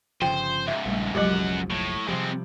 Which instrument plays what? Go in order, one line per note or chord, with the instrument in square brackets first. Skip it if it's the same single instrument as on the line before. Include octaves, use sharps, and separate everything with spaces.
[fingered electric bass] G1 C#3 F3 [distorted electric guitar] C5 [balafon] G5
[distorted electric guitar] C#2 G#2 [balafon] E5
[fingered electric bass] A#1 [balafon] G3 A3
[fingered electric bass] F#1 B1 F3 [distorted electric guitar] F#2 F#5 [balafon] F#3 G#3 G4
[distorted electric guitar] A2
[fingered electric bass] C3 F3 G3 [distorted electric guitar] G#3 C4